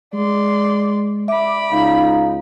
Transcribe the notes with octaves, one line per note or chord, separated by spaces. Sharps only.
G#3 D5 C6
D5 E5 B5 D6
C#2 D#4 F5